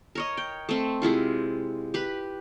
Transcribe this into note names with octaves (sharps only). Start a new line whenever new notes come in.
A#4 C#5 D#5
G5
A3 C4
C3 G#3 E4 F4
G4 B4